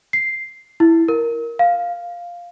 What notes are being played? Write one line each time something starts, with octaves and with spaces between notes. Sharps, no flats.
C7
E4
A#4
F5